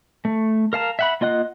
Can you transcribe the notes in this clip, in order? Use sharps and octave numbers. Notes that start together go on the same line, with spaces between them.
A3
A#4 F5 A5 A#5
E5 F#5 B5
A#3 F4 D#5 F#5 F#6